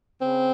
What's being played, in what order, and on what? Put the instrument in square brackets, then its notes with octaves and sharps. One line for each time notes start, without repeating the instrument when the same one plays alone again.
[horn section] C#3 C4